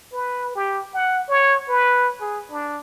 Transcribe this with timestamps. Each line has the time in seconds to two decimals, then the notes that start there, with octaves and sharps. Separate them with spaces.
0.12 B4
0.55 G4
0.94 F#5
1.28 C#5
1.68 B4
2.21 G#4
2.51 D4